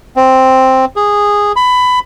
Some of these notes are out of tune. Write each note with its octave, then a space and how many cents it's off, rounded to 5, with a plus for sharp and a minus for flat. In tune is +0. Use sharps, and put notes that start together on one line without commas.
C4 +0
G#4 -10
B5 +15